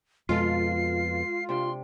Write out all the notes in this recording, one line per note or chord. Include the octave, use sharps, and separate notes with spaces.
F2 B2 G#3 F4 A4 C7
C3 D4 G4 C6